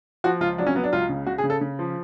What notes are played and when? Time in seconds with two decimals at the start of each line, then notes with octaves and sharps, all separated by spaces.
0.24 F3 F#4
0.40 C#2 F4
0.58 F#3 D4
0.66 C#4
0.75 F#3 B3
0.84 D4
0.93 C#2 F4
1.09 C#3
1.27 C#3 F#4
1.38 G#4
1.44 C#3
1.50 A4
1.61 C#3
1.79 F3